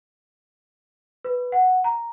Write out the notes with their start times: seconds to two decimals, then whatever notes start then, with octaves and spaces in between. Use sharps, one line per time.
1.25 B4
1.52 F#5
1.84 A#5